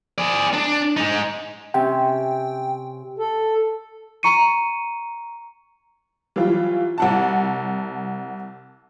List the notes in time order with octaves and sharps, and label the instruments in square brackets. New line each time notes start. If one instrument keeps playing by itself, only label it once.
[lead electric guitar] G#4 D5
D4
G#3 D#4
[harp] C3 C#4 [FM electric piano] G5
[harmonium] A4
[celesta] A#5 C#6 C#7 D#7
[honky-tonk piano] E3 F#3 G3 F4
C2 F#5 A5